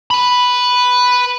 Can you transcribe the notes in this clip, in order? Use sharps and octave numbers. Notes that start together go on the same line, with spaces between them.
B4 B5